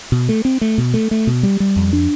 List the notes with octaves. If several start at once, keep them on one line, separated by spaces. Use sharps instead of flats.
B2
A3
C4
A3
B2
A3
A3
B2
G3
G3
F2
D4